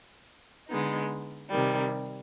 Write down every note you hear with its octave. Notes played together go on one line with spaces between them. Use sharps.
D3 G#3 B3 D#4
C3 D#3 G3